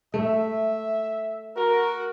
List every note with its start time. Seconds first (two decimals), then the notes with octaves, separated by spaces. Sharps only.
0.14 A3 E5
1.56 F#4 A#4